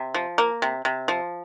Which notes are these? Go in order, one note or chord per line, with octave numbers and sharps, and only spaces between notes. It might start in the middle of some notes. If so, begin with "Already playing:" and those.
Already playing: C3
F3
A#3
C3
C3
F3